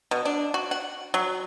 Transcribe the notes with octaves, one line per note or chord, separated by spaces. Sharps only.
B2
D4
F#4
F#5
F#3